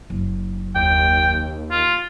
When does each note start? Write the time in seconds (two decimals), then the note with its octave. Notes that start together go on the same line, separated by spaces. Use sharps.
0.10 F#1
0.75 D#2 G5
1.71 F4